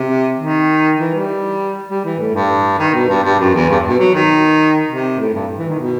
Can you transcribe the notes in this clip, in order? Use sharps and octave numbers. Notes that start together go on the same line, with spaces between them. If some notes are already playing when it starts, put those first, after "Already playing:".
Already playing: C3
D#3
E3
G3
G3
E3
A2
G2
D#3
B2
G2
G2
F#2
E2
G2
B2
F#3
D#3
C3
A2
G2
E3
D#3
B2